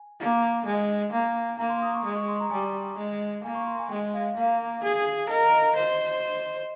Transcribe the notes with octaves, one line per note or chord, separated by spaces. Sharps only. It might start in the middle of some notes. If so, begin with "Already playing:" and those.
Already playing: G#5
A#3
G#3 G#5
A#3
A#3 A#5
C6
D#6
C#6
G#3 D#6
C#6
C6
A#5
G3 G#5
G#3
A#3 G#5
C#6
C6
G#5
G#3 G5
F5
A#3 F5
G#4
A#4 D#5
D#5
C5 D#5